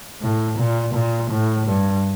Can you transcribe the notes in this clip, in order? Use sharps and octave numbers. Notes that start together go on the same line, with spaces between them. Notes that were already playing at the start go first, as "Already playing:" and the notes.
A2
A#2
A#2
A2
G2